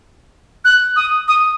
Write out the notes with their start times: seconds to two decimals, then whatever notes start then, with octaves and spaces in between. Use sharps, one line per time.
0.65 F#6
0.96 D#6
1.28 D#6